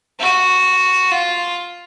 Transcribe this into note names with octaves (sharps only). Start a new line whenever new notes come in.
F#4
F4